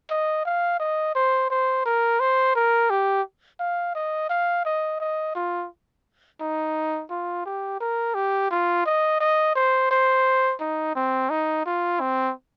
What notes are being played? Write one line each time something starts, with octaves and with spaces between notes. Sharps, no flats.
D#5
F5
D#5
C5
C5
A#4
C5
A#4
G4
F5
D#5
F5
D#5
D#5
F4
D#4
F4
G4
A#4
G4
F4
D#5
D#5
C5
C5
D#4
C4
D#4
F4
C4